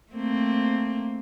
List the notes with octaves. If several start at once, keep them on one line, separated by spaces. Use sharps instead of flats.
A3 A#3 C4